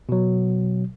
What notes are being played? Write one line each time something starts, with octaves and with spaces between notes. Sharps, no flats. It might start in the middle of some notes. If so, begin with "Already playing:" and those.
B2 F#3